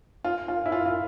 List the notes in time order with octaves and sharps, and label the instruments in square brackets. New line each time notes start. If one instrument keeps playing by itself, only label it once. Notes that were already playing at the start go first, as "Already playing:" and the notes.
[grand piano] F4
F4
E4
F4
F4